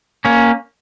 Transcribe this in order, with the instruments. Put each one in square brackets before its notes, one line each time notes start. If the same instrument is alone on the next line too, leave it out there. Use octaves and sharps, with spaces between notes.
[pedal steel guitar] A#3 C#4